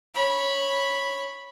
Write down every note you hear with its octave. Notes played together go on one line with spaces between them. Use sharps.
C#5 B5